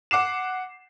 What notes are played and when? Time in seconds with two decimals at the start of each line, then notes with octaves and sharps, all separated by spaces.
0.11 F#5 D6 C7 E7